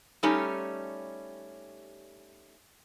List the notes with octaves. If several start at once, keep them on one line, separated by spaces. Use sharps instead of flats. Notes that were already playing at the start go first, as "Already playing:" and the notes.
G3 A3 C#4 D#4 G4